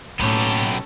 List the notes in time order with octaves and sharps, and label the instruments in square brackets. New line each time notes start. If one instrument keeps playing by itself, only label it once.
[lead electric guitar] B1 [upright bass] A2 A#3 [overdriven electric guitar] B3 G4 [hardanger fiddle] C#4 A4